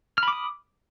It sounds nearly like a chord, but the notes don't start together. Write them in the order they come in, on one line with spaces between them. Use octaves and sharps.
F6 B5 D6 D#6